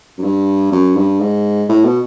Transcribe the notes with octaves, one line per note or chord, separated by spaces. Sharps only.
F#2
G2
F#2
G2
G#2
A2
B2